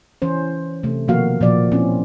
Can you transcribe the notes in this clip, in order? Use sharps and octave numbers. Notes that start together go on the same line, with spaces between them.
E3 C#4 C5
C3 A3
B2 D#3 F3 A#3 F#4 F5
A#2 F3 A#3 D5
C4 C#4 E4